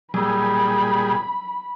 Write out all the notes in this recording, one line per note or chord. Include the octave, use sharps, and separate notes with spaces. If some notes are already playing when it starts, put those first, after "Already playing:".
A#2 F#3 G3 G#4 B5